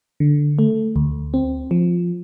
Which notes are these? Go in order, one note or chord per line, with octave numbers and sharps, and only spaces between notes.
D3
A3
D2
C4
F3